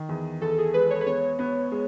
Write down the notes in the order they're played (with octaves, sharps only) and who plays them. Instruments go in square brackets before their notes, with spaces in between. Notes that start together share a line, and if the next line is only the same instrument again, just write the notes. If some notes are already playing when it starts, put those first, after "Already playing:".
Already playing: [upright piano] D#3
E2
[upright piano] E2 [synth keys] A4
[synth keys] G#4
[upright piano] G#3 [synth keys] B4
[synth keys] C#5
B4
[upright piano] B3 [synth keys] C#5
[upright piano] B3
G#3